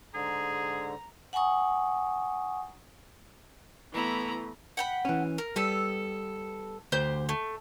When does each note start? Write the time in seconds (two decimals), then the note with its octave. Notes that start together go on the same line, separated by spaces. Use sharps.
0.14 G#2 D3 G#4 A#5
1.33 F#5 G#5 A#5 C#6 D#6
3.93 E3 A3 B3 E4 A#5
4.77 F#5 G5 B5
5.05 E3 C#4
5.38 A#4
5.56 G3 B3 A4 E6
6.92 D2 G4 C5 G6
7.29 A3